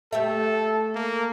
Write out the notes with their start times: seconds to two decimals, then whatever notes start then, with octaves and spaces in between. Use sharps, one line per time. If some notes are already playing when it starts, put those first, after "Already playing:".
0.13 A3 G4 A4 E5
0.95 A#3